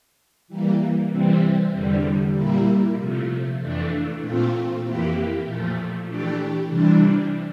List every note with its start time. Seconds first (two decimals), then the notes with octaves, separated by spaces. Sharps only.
0.48 E3 G3 A#3
1.10 C3 E3 G3 C4
1.72 E2 D3 G3
2.34 A#2 G3 A#3 E4
2.96 C3 F3 A3
3.59 F2 E3 A3 D4
4.20 A#2 A3 C4 F4
4.82 F2 E3 A#3 E4 G4
5.44 A#2 F3 A3
6.06 E3 A3 D4 G4
6.68 C3 E3 G3 D4